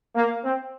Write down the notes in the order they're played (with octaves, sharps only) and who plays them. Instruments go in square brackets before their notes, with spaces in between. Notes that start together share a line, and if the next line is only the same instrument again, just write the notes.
[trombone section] A#3
C4